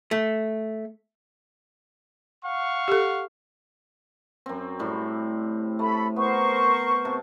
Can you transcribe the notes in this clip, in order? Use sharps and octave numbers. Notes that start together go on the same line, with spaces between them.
A3
F5 F#5 C#6
G4 A4
F#2 C4
A2 G3
A3 A4 B5
B3 A#4 C5 C#6
C3 A5